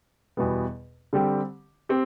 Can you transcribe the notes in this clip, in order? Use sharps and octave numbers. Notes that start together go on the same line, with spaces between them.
E2 B2 G3 B3
D3 G3 C4 G4
C4 G4